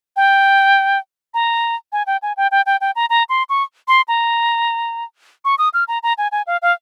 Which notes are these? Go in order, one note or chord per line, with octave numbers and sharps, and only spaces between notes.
G5
A#5
G#5
G5
G#5
G5
G5
G5
G5
A#5
A#5
C6
C#6
C6
A#5
C#6
D#6
F6
A#5
A#5
G#5
G#5
F5
F5